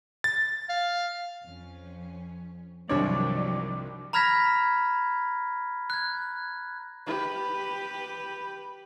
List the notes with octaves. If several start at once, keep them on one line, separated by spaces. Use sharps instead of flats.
A6
F5
F2 C#4
C2 G2 D#3 F3 F#3 C#5 D5
A#5 B5 F6 G#6 A#6 B6
F#6 G#6
G4 B4